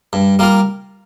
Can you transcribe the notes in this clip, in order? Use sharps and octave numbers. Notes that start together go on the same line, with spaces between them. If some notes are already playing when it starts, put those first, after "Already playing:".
G2
G3 A#3 F4 A#4